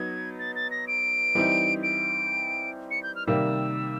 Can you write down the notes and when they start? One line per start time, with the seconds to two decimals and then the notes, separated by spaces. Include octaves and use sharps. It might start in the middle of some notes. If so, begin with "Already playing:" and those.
Already playing: F#3 B3 D#4 G#6
0.39 A6
0.56 A6
0.71 A#6
0.88 D7
1.35 E3 G3 C4 D#4
1.83 D7
2.91 C#7
3.03 G6
3.16 F6
3.27 C3 D#3 G3 A#3 E6